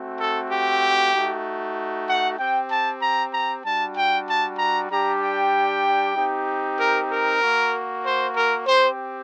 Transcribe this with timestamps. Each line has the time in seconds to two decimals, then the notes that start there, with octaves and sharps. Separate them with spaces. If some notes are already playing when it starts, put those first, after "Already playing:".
Already playing: A3 C4 F#4
0.19 A4
0.50 G4
1.13 A3 D#4 F#4
2.07 F#5
2.38 C4 G4 G5
2.70 A5
3.02 A#5
3.33 A#5
3.64 G3 D4 F#4 A5
3.96 G5
4.27 A5
4.58 A#5
4.90 G3 D4 G4 A#5
5.21 G5
6.15 C4 D#4 G4
6.78 A#4
7.10 A#4
7.42 A#3 F#4
8.04 C5
8.35 A#4
8.66 C4 G4 C5